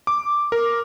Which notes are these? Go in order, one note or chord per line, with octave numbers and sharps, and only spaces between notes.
D6
A#4